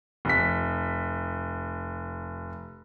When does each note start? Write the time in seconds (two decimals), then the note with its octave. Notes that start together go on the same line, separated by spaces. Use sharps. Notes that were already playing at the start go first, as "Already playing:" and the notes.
0.25 F1 B6